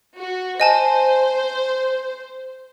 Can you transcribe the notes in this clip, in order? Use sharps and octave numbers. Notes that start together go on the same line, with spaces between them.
F#4
C5 D#5 G#5 A5